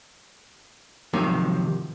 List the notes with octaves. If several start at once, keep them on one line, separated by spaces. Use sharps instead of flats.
G#2 C3 D#3 F3 F#3